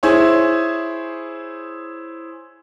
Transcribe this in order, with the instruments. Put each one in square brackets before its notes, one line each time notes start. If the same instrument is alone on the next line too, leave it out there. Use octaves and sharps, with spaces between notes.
[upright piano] E4 G#4 C5 C#5